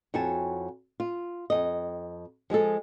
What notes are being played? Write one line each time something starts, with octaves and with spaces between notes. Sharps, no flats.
F2 E4 F#4 C#5 G#5 A5
F4
F2 D#3 D#5
F3 G#3 G#4 A4